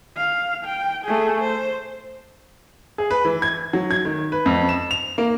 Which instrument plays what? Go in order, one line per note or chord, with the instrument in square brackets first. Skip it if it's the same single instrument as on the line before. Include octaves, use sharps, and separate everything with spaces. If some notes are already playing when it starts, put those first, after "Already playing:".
[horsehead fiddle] F5
G5
A3 G#4
C5
[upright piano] G#4
B4
E3
G#6
F#3
G#6
D#3
B4
F2
E7
F7
A#3